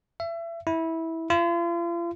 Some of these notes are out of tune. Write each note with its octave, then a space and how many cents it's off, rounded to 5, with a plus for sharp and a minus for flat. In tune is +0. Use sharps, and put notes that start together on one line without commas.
E5 +30
E4 -15
F4 -40